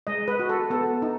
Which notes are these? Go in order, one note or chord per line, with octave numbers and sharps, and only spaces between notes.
G#3 D#5
B4
F#4
A4
B3 A4
D#4